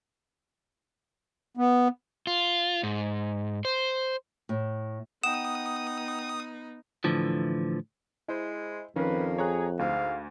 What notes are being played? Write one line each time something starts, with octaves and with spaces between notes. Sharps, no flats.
B3
F4
G#2
C5
A2
B3 D#4 F#5 G5 D#6 E7
A2 D3 E3 F3
G#3 E4 C5
F2 D#3 F3 A#3 C#4 B4
G#4 C#5 A#5 F#6
D2 G#2 F5